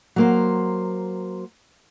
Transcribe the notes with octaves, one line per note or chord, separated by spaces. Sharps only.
F#3 A#3 C5